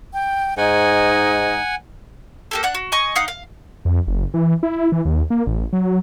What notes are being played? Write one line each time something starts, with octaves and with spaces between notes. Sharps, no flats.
G5
G#2 D#4 D#5 F#5 G#5
A#3 G4 A4
D4 F#5 F#6
F#4
D#5 G#5 C#6
D#4 F5 F#5
F5
F2
F#1
E3
E4
E3
D#2
A#3
A1
F#3